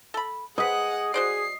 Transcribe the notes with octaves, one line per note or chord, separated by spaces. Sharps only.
A4 B5
C4 G#4 B4 D#5 F#5
F#4 G#4 C5 D5 C7